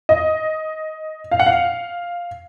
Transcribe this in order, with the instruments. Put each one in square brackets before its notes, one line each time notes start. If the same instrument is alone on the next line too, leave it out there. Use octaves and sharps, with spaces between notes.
[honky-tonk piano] D#5
F5
F#5
F5